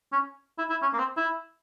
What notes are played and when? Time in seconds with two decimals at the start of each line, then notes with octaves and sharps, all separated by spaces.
0.13 C#4
0.58 E4
0.70 E4
0.82 C#4
0.93 A#3
0.99 C4
1.17 E4